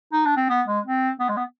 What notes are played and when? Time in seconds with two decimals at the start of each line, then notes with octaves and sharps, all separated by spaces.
0.12 D#4
0.25 D4
0.37 C4
0.49 B3
0.67 G#3
0.85 C4
1.20 B3
1.29 G#3
1.37 B3